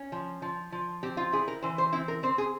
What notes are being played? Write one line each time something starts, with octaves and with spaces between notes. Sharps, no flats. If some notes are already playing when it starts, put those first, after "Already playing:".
Already playing: C#4
F3
F3
F3
C4 G4
F4
E4 G#4
A#4
E3 C5
C5
C4 E4
A#4
C4 C5
G#4